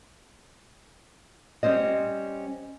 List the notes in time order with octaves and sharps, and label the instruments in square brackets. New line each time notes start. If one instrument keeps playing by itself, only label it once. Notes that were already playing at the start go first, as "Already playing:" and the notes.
[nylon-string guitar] G3 C4 C#4 C5 D#5